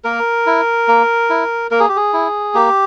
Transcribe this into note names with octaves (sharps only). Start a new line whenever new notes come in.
A#3 A#4
E4
A#3
E4
A#3 A#4
G#4
G4
G#4
E4
A#3 G4